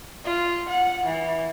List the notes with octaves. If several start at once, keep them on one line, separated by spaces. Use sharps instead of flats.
F4
F#5
E3